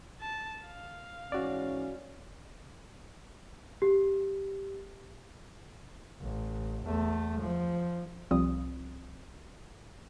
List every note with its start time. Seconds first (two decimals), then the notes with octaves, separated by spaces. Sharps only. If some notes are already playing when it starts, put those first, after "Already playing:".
0.21 A5
0.65 F5
1.32 G#2 E3 C#4 F#4 D5
3.82 G4
6.21 A1
6.85 E2 A3
7.40 F3
8.31 C2 F3 G3 C4 F4 D#6